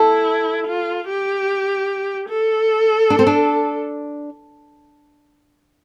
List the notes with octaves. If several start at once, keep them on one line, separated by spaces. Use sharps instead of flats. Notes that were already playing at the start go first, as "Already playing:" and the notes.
Already playing: E4 A4
F4
G4
A4
D4
C4
D4